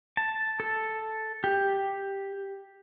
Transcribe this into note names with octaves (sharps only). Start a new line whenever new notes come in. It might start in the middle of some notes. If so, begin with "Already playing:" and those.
A5
A4
G4